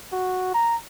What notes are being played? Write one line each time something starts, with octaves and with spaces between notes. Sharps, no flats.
F#4
A#5